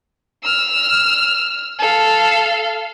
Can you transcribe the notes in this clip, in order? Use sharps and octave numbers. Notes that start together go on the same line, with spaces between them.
E6 F6
A4 F5